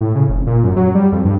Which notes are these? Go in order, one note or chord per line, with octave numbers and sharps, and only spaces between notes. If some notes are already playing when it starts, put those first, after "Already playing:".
A2
C#3
F1
A#2
F#2
F#3
G3
F2
G2